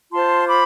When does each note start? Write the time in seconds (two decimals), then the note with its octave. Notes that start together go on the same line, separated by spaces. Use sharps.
0.12 F4 C5 A5 C6
0.47 B5 D6